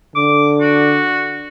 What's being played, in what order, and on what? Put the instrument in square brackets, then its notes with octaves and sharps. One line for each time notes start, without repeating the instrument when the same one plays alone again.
[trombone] D3 [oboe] D6
[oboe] F#4